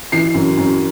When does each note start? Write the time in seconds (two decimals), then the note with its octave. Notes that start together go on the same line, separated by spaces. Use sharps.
0.12 E3 C7
0.34 F#2
0.57 F#2